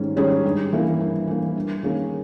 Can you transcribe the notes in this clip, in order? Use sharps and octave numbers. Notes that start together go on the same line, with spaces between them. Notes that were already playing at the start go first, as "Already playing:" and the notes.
Already playing: G#2 D#3 G3 C#4 G#4
D#3 G3 C#4 G#4
G2
E3 A#3
G2
E3 A#3
G2
D#3 A#3 C#4 G#4